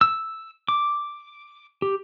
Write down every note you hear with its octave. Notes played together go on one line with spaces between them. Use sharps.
E6
D6
G4